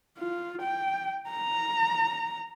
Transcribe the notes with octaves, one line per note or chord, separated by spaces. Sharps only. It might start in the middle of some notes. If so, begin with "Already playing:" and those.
F4
G5
A#5